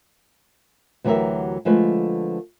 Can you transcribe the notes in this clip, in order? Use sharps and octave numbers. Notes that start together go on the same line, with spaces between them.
D2 E3 F#3 G4 A#4 E5
D3 F3 G#3 A3 B4